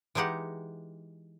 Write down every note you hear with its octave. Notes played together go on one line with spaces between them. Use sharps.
E3 G#3 D#4 G4 F#5